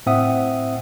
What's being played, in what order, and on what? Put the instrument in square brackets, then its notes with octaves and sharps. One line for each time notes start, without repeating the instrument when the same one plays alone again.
[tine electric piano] A2 C4 E5 F#5 D#6